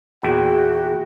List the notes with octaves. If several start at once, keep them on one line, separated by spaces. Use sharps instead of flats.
E2 A#2 E4 F#4 G#4 G5